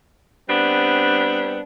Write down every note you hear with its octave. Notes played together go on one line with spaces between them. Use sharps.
G3 B3 C4 D4